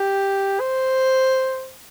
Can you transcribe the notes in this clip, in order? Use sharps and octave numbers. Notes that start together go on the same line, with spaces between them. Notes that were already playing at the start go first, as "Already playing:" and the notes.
Already playing: G4
C5